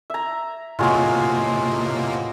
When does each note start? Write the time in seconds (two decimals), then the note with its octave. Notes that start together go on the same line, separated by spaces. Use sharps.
0.10 E5 A#5
0.79 A2 C3 F#3 G#3 A#3 F4